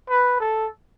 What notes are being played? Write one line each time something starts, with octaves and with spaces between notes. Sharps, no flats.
B4
A4